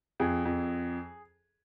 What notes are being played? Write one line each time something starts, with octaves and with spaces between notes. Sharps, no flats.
F2 G#4
F2